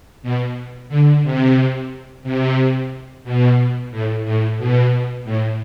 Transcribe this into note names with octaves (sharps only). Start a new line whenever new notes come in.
B2
D3
C3
C3
B2
A2
A2
B2
A2